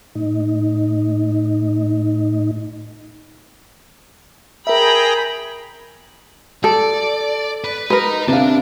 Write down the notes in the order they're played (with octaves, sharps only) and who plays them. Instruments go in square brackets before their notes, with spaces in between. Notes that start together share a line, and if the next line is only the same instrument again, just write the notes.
[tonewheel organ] A2 D#4
[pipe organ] G#4 G5 A#5 [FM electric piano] A#4 E5 [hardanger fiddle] B5
[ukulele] A4 [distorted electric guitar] D5
[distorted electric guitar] B4
[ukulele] A#4 B4 [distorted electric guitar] D#5 A#5
[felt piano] C3 F5 [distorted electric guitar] D4 A5